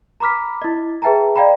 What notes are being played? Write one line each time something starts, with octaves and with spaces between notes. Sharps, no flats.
A#5 B5 D6 F6 B6
E4 D#5
G#4 B4 E5 G5 A5 A#5
D5 D#5 F5 G5 A#5 B5